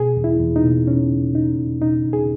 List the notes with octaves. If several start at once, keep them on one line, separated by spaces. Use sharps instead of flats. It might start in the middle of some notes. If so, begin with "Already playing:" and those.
Already playing: B2 G#4
E2
E4
E2
D#4
B2
B2 C#4
E2
B2 D#4
E2
B2 D#4
E2
G#4